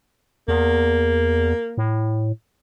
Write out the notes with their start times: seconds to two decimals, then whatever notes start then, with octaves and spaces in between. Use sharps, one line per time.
0.48 E2 A#3
1.78 A2